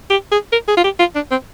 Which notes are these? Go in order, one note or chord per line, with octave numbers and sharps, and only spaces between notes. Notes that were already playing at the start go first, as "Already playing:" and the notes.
G4
G#4
A#4
G#4
F4
G4
F4
D4
C4